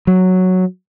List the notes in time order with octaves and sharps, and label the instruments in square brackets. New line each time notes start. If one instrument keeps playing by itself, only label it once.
[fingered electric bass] F#3